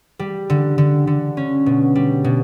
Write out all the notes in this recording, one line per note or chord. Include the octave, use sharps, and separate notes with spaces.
G3
D3
D3
D3
C#4
B2
G3
B2